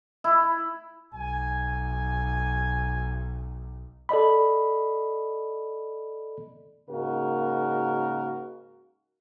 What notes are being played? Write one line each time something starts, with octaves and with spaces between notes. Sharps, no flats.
E4
B1 G#5
A4 D5 D#5 B5
G#2 C#3 A#3 D#4 F#4 A#4